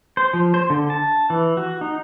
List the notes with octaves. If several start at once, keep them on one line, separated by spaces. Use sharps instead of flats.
C5
F3
C5
D3
A5
E3
F#4
D#4